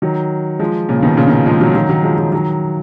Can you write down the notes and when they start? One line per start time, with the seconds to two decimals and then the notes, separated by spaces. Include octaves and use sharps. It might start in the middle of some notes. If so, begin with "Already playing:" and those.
0.02 D#3 F#3
0.59 F3 G#3
0.89 A#2 C#3
1.02 B2 D#3
1.17 A#2 C#3
1.27 B2 D#3
1.46 F3 G#3
1.61 D#3 F#3
1.75 D#3 F#3
1.89 D#3 F#3
2.03 F3 G#3
2.18 D#3 F#3
2.32 D#3 F#3